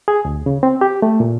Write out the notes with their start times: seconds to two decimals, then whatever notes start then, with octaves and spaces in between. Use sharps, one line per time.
0.08 G#4
0.25 D2
0.46 C#3
0.63 C4
0.81 G4
1.02 A3
1.20 A#2